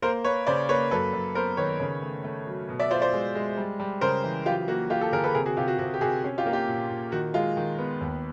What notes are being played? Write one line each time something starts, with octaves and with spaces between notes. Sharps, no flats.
A#3 A#4 C5
A#3 B4 C#5
C#3 C5 D5
A#3 B4 C#5
F#2 A4 B4
F#2
B3 A#4 C5
D#3 B4 C#5
C#3
A3
A3
F#3
B2
D5 E5
F4 C5 D5
C5 D5
G#3
G#3
G3
G3
C#3 A#4 C5
E3
F#3 F4 G4
A#3 F#4
A#3 F4 G4
G4 A4
D3 G#4 A#4
A4 B4
C3 G#4 A#4
F#4 G#4
C3 F4 G4
F#4
C3 F#4
G4
C3 F#4 G#4
C#4
F4 G4
A#3
F4 G4
A#2
A#2
D#3 F#4
G#3 F4
D#3
B3
D#2